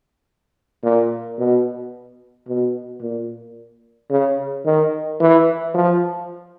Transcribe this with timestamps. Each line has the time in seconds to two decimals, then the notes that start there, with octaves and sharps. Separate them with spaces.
0.83 A#2
1.38 B2
2.48 B2
3.01 A#2
4.10 C#3
4.65 D#3
5.20 E3
5.74 F3